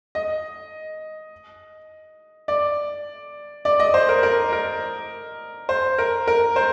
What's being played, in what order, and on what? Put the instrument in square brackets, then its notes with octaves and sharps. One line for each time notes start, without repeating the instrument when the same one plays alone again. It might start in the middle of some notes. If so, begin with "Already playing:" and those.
[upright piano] D#5
D5
D5
D#5
C5
A#4
A#4
A#4
C5
A#4
A#4
C5